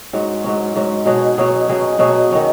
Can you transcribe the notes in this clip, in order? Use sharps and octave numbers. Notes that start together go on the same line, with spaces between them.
G#2 F#3 C#4
G#2 F#3 C#4
G#2 F#3 C#4
B2 F#3 C#4 G#4
B2 F#3 C#4 G#4
B2 F#3 C#4 G#4
B2 F#3 C#4 G#4
D#3 F#3 C#4